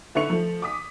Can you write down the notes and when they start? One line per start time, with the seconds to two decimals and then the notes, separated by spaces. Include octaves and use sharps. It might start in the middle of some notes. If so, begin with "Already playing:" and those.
0.15 D3 E4 B4 C#6 C#7 F7
0.30 F3 A3
0.62 D6 D#6 B6